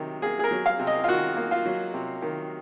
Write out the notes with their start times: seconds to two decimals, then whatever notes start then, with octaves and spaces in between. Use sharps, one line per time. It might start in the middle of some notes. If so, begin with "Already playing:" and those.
Already playing: C3 D#3 F#3
0.22 A#3 G#4
0.39 G#4
0.44 A#4
0.51 F#3
0.66 F5
0.79 C3
0.87 D#5
1.04 F4
1.08 D#3 F#4
1.37 A#3
1.51 F4
1.66 F#3
1.94 C3
2.22 D#3